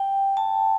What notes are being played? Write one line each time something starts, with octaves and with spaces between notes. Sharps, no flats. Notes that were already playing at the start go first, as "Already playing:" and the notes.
Already playing: G5
A5